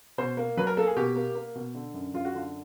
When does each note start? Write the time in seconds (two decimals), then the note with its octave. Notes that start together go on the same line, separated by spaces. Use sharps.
0.18 B2 C5
0.37 A#3
0.57 F#3 B4
0.67 A#4
0.77 A#3 A4
0.87 G#4
0.97 B2 G4
1.16 A#3
1.35 A#3
1.55 B2
1.75 D3
1.94 F#2
2.14 F#2 F4
2.25 F#4
2.33 D3 F4